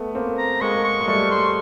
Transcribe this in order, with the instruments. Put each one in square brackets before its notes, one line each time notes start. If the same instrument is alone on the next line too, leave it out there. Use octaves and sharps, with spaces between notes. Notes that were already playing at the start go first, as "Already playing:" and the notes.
Already playing: [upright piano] A3 B3
A#3 C4
[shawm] A#5
[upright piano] G#3 A#3 [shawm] C#6
[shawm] C#6
[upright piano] G#3
[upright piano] G3 A3 [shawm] C#6
[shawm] C6